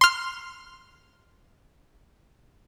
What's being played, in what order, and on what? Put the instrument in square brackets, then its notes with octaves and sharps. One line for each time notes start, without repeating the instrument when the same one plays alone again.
[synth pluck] C6 F6